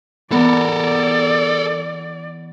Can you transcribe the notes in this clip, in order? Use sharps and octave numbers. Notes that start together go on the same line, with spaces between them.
E3 B3 A4 A#4 D5